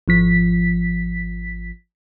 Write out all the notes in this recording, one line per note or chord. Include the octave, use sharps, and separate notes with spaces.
G#1 F3 B6